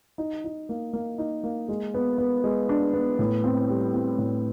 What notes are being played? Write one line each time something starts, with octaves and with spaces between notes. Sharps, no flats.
D#4
D#4
A#3
A#3
D#4
A#3
G#3
B3
B3
G#3
D4
B3
A2
C4
G3
C4
A2